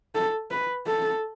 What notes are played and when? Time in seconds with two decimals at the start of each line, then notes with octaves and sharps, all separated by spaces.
0.15 A4
0.51 B4
0.87 A4